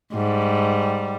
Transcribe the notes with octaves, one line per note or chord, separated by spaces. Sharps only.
G#2 G3